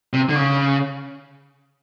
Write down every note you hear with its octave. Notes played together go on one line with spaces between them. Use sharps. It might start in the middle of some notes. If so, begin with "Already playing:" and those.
C3
D3
C#3